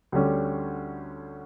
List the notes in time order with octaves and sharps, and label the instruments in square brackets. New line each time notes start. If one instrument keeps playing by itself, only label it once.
[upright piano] D2 D3 G3 C#4